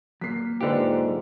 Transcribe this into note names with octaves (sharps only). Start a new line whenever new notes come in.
F#3 A#3 B6 C7
G#2 D3 F4 G4 B4 D5